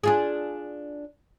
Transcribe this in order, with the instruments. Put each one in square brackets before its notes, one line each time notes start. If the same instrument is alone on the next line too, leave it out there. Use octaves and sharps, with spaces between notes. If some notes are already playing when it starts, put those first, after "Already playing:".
[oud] D4 F4 G#4